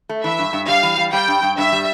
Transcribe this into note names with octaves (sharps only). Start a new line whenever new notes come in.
A3
E3 E5
G2
G2
G3 F5
E3
G3
G3 G5
G2
G2
G2 E5
G3